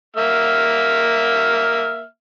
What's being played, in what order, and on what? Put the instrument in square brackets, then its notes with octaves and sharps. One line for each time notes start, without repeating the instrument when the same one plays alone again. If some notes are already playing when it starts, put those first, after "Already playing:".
[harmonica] A#3 E5 F6